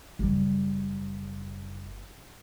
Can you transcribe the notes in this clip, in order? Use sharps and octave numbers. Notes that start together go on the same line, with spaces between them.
F#1 G3